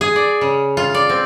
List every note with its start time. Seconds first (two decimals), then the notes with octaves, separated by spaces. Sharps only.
0.01 G#4
0.16 D5
0.41 C#3
0.77 F4
0.94 D5
1.09 C4